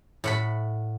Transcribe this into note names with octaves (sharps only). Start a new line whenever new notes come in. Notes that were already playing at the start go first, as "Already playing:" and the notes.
A2 F#5 B5